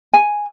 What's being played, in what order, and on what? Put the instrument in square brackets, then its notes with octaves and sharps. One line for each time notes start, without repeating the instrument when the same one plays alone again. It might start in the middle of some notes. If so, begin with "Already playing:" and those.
[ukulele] G#5